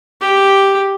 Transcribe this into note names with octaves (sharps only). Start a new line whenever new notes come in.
G4